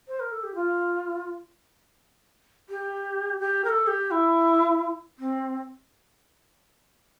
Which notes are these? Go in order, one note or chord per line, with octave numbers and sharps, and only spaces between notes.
C5
A#4
A4
G4
F4
G4
G4
A#4
A4
G4
E4
C4